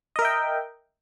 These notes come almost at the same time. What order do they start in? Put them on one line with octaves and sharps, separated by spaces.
D#5 A#4 E5 G5